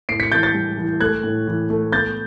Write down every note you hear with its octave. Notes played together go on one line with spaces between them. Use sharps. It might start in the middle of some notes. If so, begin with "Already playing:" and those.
A2 C7 D7
B6 C#7
E3 G6 A6
G6 A6
G3
E3
A3 F#6 G#6
A2
E3
A3
B3 G6 A6